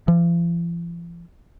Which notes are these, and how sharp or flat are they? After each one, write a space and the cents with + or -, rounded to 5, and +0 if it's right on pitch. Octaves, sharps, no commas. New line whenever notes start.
F3 -45